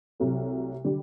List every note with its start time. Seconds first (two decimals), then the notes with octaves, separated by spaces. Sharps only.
0.20 C2 C3 F#3 A3
0.84 D3 G3